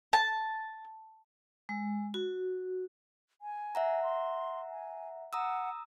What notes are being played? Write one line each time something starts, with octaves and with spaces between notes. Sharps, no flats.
A5
G#3
F#4
G#5
E5 F#5 A#5
C6
G#5
F#5 A#5 D#6 E6